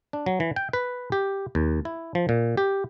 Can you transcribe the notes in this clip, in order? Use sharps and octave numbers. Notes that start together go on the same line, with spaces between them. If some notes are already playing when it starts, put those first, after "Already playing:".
D4
F#3
E3
G5
B4
G4
D#2
E4
F3
A#2
G4